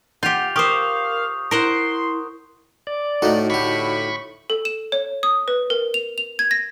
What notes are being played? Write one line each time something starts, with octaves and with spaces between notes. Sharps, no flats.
F4 G4 F#5 G6 F7
G4 A#4 C5 F5 C#6 D#6
E4 A#4 C5 F#5 C6
D5
A2 A3 D#4 F#4 A4
D3 G4 B5 C#6
A4
E7
C#5
D#6
B4
A#4
F7
F7
G#6
A#6